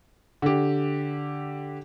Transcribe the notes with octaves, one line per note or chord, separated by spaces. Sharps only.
D3 G4